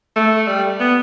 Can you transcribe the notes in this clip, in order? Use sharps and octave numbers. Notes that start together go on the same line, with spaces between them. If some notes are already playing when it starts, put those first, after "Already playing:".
A3
G3
B3